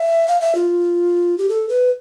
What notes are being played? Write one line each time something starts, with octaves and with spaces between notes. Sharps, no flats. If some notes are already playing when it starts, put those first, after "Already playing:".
Already playing: E5
F5
E5
F4
G4
A4
B4